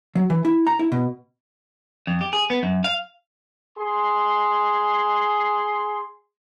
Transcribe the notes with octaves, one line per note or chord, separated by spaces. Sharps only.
F#3
E3
E4
A#5
E4
B2
F2
G4
G#4
B3
F#2
F5
G#4 C6